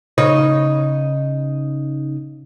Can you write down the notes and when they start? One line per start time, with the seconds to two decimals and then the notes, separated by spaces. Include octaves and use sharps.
0.18 C#3 D#4 C#5